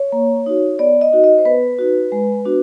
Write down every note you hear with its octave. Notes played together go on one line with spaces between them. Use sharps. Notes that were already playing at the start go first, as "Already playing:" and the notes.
Already playing: C#5
A#3
D#4 F#4
B3 D5
D#5
D#4 F#4
D#5
C5
B3 B4
D#4 F#4
G#3
B3 D4 F#4